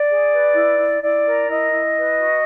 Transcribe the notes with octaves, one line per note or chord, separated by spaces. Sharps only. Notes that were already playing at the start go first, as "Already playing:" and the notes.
Already playing: D5
G#4
B4
E4
E4
E4 D5
A#4
E4 D#5
E4
B4
F#4